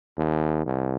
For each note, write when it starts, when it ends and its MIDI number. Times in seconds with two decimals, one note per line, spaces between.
0.18 0.63 39
0.65 0.97 36